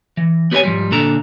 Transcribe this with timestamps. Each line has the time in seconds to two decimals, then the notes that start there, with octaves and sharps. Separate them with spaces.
0.17 E3
0.51 B3 G4 A#4 B4 C#5 G#5
0.63 G#2 F3 G3
0.91 A#2 D3 A4 A#5